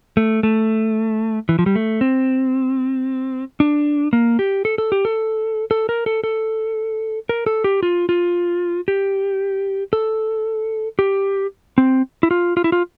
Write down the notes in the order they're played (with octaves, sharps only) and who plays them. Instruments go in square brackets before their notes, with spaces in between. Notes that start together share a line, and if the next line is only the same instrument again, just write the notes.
[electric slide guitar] A3
A3
E3
F3
G3
A3
C4
D4
A#3
G4
A4
A4
G4
A4
A4
A#4
A4
A4
A#4
A4
G4
F4
F4
G4
A4
G4
C4
E4
F4
F4
E4
F4